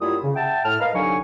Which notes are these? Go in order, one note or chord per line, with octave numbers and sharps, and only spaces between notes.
F#2 G3 A#3 E4 F4 D#6
C#3
E5 F#5 G5 A5
A2 F6
A#4 B4 D#5 F5
C2 D3 F#3 D#4 G#5 C#6